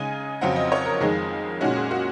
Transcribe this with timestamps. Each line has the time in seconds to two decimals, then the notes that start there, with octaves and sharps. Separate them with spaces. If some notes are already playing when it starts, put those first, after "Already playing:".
Already playing: C#3 G#3 D#4 G#5
0.41 F2 C#3 F#3 C4 F#5
0.56 D#5
0.72 C#5
0.86 A#4
1.01 F2 D#3 G#3 G#4
1.61 A#2 G#3 C#4 F#4
1.76 G#4
1.91 F#4